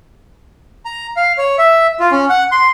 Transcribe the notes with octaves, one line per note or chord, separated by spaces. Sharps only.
A#5
F5
C#5
E5
F4
C#4
F#5
C6